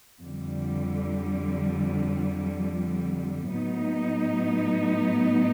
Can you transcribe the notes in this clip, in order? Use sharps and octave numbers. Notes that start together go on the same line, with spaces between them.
F2 D3 G3
A2 F#3 B3 D#4